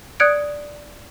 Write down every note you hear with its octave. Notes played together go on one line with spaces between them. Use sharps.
D5 D#6 F#6 G#6 C#7 D7